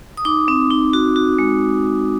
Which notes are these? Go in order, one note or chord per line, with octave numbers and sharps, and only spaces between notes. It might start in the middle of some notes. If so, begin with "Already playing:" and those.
D#6
D#4 D6
C4
D#4
F#4
F#4
G#3